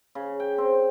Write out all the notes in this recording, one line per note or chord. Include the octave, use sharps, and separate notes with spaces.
C#3
G5
C4